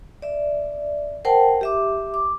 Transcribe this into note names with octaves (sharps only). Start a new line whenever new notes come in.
D5 E5
A#4 C5 F#5 G5 A5
G4 E5 D6
D6